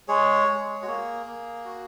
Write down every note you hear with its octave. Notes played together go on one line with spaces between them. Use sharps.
G#3 G#4 C#5
G#3
F#4
A#3 G#4
A#3
F#4